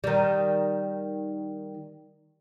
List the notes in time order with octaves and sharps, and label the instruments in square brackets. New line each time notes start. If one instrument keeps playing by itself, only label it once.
[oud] D#3 G3